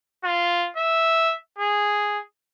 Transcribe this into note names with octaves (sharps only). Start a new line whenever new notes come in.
F4
E5
G#4